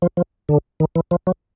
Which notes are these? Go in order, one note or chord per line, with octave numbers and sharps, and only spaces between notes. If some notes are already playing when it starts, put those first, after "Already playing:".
F3
F3
D3
D#3
E3
F3
F#3